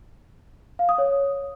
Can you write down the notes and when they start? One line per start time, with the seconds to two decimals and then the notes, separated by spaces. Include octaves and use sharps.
0.79 F5
0.89 D#6
0.98 C#5